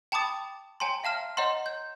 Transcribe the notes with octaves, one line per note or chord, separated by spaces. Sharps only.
G5 A5 B5 D6 D#6 A6
C#5 G5 G#5 A#5 C6
E5 F5 A5 F6
C#5 D#5 F#5 A#5 C6
G6